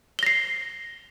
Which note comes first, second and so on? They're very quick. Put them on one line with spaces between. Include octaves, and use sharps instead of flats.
G7 A#6 C7